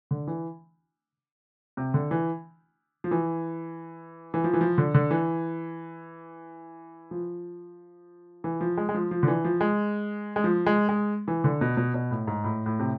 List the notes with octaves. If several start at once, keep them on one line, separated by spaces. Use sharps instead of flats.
D3
E3
C3
D3
E3
F3
E3
E3
F3
E3
F3
D3
D3
E3
F3
E3
F3
G#3
G#3
F3
F3
D3
E3
F3
G#3
G#3
F3
G#3
G#3
E3
D3
B2
B2
B2
A2
G#2
A2
A2
C3